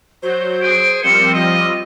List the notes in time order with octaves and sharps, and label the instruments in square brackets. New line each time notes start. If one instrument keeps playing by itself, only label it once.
[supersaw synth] F#3 G6 [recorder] C5
[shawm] G#4 [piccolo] D7
[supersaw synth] F3 G3 C4 [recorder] A#4 [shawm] C5 [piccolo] C#7
[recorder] F4 [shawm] D#5 [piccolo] D#7